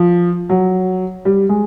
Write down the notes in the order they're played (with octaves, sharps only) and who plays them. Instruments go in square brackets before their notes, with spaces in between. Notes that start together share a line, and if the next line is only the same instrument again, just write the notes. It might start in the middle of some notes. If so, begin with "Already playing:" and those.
Already playing: [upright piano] F3
F#3
G3
G#3